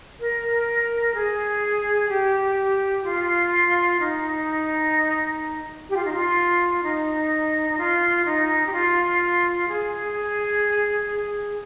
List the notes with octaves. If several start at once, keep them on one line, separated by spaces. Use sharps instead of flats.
A#4
G#4
G4
F4
D#4
G4
F4
D#4
F4
D#4
D#4
F4
D#4
G4
F4
G#4